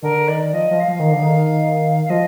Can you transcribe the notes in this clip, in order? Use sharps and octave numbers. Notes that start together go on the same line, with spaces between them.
D3 A#4
D#3 D5
F3 D#5
F3
F5
F3
D#3
D3
D#3
F5
F3 D#5